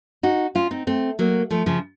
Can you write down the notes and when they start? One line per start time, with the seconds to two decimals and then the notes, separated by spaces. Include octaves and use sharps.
0.23 D#4 F#4
0.55 C#4 F4
0.71 C4 D#4
0.87 A3 C4
1.19 F#3 A#3
1.51 F3 A3
1.66 C#3 F3